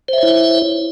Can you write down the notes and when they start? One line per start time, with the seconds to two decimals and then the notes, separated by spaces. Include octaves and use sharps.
0.08 C5
0.13 E5
0.18 C#5
0.23 E4